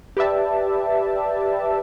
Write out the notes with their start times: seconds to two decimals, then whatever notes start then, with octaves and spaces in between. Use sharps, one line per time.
0.17 G4 B4 D5 E5 A5